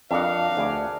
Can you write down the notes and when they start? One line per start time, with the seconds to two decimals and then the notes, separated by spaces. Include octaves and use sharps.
0.11 F2 D4 A#4 F5 F#5
0.57 D2 G#4 D5